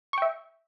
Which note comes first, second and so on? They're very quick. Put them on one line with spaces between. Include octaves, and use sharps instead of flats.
C#6 G5 E5